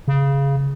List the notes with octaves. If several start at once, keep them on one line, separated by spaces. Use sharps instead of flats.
C#3